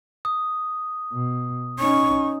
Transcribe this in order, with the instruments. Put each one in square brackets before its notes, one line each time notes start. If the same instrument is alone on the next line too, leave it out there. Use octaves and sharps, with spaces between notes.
[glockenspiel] D#6
[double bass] B2
[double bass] C#4 D#4 [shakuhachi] C#6